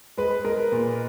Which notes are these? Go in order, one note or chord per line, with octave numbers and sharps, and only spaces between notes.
G#3 B4
G#3 A#4
A#2